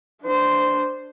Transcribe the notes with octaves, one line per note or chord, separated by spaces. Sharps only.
D4 C5